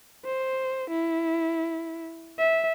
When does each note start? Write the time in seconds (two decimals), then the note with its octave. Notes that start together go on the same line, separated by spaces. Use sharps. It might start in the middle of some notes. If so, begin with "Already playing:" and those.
0.25 C5
0.90 E4
2.38 E5